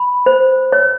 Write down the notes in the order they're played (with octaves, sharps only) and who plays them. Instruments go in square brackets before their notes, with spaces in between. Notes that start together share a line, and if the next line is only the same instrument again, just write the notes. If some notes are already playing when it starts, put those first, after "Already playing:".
Already playing: [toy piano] B5
C5
C#5